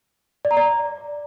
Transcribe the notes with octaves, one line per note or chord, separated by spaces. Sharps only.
D5
A#5
D5